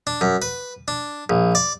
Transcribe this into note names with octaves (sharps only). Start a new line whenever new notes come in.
D4
F#2
B4
D4
A#1
D5